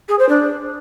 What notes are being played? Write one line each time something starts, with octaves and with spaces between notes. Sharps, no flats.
G#4
C5
D4